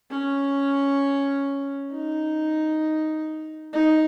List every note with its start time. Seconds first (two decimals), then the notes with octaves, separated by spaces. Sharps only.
0.10 C#4
1.91 D#4
3.73 D#4